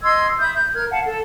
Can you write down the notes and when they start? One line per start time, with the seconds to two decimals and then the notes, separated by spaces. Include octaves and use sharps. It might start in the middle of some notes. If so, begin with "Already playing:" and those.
0.02 D#5 C6 E6 G#6
0.40 E5 B5 D#6 G6
0.54 G6
0.74 A#4 F6 G#6
0.90 F5 F#5 A5
1.04 A4